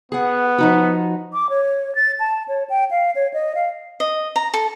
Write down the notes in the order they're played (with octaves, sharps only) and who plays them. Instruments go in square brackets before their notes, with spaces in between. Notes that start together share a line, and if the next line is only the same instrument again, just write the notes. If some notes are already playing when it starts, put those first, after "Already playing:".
[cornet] B3 [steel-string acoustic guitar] G#4 F#5
[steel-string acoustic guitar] F3 D#4 F#4
[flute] D6
C#5
A6
A5
C#5
G5
F5
C#5
D#5
F5
[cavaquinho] D#5
A#5
A4